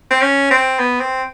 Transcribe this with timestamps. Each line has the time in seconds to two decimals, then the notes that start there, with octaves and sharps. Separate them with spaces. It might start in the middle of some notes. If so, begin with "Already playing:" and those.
0.10 C4
0.22 C#4
0.51 C4
0.79 B3
1.00 C4